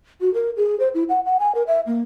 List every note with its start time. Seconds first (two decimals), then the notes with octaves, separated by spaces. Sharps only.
0.21 F#4
0.34 A#4
0.57 G#4
0.79 C5
0.94 E4
1.09 F#5
1.25 F#5
1.39 G#5
1.55 A#4
1.67 E5
1.87 A#3